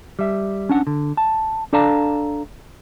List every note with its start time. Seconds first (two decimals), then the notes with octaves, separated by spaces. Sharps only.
0.19 G3 E5
0.69 C#4 D4 F#5
0.87 D3
1.17 A5
1.73 D4 A4 D5 F5 A5 A#5